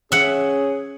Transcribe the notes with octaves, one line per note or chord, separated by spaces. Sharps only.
C#4 G#4 E5 F#5